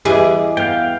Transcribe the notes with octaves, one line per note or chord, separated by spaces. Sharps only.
E2 G4 G#4 B4 D#5
B3 F5 G5